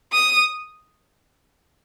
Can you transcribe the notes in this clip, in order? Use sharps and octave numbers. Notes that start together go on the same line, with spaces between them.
D#6